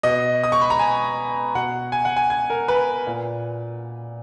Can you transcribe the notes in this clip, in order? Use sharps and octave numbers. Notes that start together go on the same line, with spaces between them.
B2 D#5
D#6
C#6
B5
A#5
G#5
B2 F#5
G#5
F#5
G#5
G#5
A#4
B4
A#2